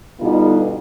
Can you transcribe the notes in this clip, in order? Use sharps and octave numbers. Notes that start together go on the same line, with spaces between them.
B2 D3 G3 B3 D#4 F4